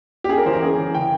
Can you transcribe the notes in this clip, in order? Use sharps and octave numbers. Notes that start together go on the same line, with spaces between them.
G4
C#4 G#4
A#4
E3 C5
A#4
C#4 G#4
E3
C#3 G5